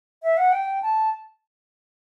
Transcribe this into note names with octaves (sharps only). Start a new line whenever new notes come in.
E5
F#5
G5
A5